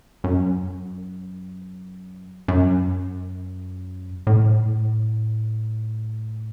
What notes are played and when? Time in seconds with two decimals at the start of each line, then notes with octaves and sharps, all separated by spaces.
0.24 F#2
2.48 F#2
4.27 A2